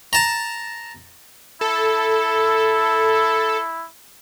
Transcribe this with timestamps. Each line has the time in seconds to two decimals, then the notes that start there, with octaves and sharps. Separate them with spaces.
0.13 A5 A#5
1.61 E4 A4